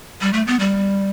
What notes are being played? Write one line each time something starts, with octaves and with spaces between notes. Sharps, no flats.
G3
A3
B3
G3